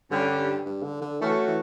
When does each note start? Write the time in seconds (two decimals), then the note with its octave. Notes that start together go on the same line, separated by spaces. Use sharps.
0.10 G2 D3 G3 C#4 G4
0.66 G2
0.83 D3
1.02 D3
1.20 E3 A3 C#4 F#4
1.47 E3